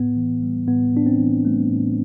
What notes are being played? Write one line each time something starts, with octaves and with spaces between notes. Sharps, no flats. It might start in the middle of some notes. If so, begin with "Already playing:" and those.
Already playing: A2 B3
E3
G3
A2 B3
A2 D4
C4
E3
G3 A3
A2